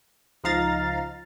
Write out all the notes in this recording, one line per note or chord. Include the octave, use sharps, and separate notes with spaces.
C#2 F3 D#4 F5 A#5 A6